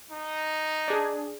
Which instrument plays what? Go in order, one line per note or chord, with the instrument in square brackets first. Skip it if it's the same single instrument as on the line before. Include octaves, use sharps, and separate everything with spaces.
[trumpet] D#4
[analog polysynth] D4 G#4